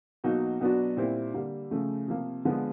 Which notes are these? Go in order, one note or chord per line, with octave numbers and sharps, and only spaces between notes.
B2 F#3 A#3 D#4 F#4
B2 F#3 B3 D4 F#4
A#2 G3 C4 E4
D3 G3 A#3
C#3 F3 A3
C3 F3 A#3
D3 F3 G#3 B3